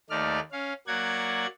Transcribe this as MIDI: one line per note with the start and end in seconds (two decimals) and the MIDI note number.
0.10 0.40 39
0.10 0.40 57
0.10 0.40 63
0.10 0.40 74
0.10 0.40 89
0.52 0.73 61
0.52 0.73 77
0.87 1.46 54
0.87 1.46 58
0.87 1.46 74
0.87 1.46 78
0.87 1.46 92